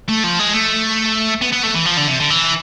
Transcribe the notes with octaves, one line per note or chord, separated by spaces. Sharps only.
A3
F3
G#3
A3
B3
B3
A3
E3
F3
D3
C3
D3
E3